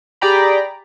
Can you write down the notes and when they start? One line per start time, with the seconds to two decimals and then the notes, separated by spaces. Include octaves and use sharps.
0.21 G4 G#4 D5 G5 A#5 B5